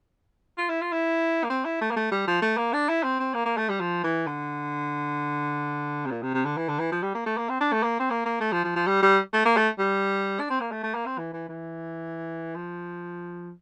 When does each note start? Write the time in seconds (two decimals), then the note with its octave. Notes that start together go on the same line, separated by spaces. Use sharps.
0.58 F4
0.69 E4
0.81 F4
0.92 E4
1.44 A#3
1.50 C4
1.65 E4
1.81 A3
1.91 A#3
1.96 A3
2.12 G3
2.27 F3
2.42 A3
2.57 A#3
2.73 D4
2.89 E4
3.03 C4
3.19 C4
3.34 A#3
3.45 A#3
3.57 A3
3.69 G3
3.80 F3
4.04 E3
4.27 D3
6.06 C3
6.11 A#2
6.22 C3
6.34 C3
6.45 D3
6.57 E3
6.69 D3
6.79 E3
6.92 F3
7.03 G3
7.15 A#3
7.26 A3
7.38 A#3
7.49 C4
7.61 D4
7.73 A3
7.83 A#3
8.00 C4
8.10 A#3
8.25 A#3
8.41 A3
8.52 F3
8.64 F3
8.76 F3
8.87 G3
9.03 G3
9.33 A3
9.45 A#3
9.56 A3
9.79 G3
10.39 D4
10.50 C4
10.60 A#3
10.71 A3
10.83 A3
10.95 A#3
11.06 C4
11.18 E3
11.33 E3
11.49 E3
12.56 F3